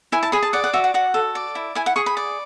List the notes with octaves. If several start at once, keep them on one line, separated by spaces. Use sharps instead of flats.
E4 G#5
A5
G#4 B5
A5
D5 F#5
F#5
F#4 E5
F#5
F#4 F#5
A4
D5
E4
E4 G#5
F#5
G#4 C#6
B5
D5